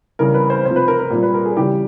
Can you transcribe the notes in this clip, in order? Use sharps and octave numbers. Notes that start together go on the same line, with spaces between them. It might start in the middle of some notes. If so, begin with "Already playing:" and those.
C#3 E3 G3 A#4
B4
C5
C3 F3 C5
B4
A#4
A#4
A#2 G3
B4
A#4
G#4
C#3 E3 G3 G4